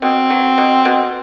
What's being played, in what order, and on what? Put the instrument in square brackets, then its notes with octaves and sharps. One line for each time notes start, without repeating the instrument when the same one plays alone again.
[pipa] B2 [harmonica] C4
[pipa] F#3
B2
B2